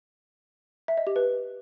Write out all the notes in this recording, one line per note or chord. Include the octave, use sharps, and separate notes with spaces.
E5
D#5
G4
B4